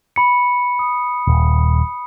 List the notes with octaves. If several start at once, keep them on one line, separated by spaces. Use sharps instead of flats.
B5 C#7
D#6
D#1